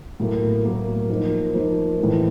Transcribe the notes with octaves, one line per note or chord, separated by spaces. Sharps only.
A2 F#3 A#3
A2 F#3 A#3
F3 A#3 D#4
F3 A#3 D#4
A2 E3 G#3